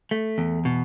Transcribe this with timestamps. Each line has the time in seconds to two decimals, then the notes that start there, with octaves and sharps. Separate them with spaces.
0.11 A3
0.38 E2
0.65 B2